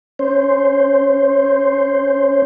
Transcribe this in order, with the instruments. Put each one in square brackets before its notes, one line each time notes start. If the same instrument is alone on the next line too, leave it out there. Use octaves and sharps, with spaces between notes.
[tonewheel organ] C#4 C5